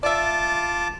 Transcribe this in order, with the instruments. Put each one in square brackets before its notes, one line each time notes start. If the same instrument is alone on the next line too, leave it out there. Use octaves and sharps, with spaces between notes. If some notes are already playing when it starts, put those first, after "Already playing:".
[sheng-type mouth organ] F4 A5 D6 [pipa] D5 E5